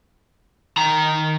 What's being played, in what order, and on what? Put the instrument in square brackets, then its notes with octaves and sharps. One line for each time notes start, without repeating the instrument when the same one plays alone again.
[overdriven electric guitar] D#3 A#5